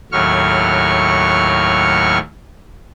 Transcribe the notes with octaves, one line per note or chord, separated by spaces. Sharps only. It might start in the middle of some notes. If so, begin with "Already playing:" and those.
D#2 A2 F#3 C#6 F6